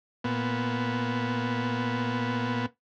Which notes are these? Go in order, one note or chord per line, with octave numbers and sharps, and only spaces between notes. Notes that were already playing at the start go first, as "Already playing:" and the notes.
A#2 B3